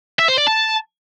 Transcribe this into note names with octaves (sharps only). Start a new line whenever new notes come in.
E5
C5
D5
A5